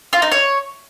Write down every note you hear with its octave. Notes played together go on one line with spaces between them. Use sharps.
F4
D#4
C#5